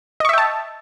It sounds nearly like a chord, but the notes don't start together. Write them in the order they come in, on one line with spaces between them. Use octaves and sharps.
D#5 C#6 E5 G5 A5